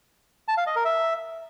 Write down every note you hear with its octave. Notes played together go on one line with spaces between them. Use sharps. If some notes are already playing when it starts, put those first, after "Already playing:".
A5
F5
D#5
A#4
E5